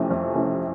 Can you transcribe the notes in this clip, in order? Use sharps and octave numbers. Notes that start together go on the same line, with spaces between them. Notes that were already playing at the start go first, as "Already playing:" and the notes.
Already playing: F2 C3 E3 A3 C#4
F2
C3 E3 A3 C#4